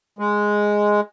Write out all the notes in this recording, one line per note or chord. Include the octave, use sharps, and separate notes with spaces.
G#3